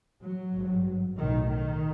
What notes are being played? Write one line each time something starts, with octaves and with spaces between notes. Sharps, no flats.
F#3
G#1 G2
B1 A2 D#3
D#3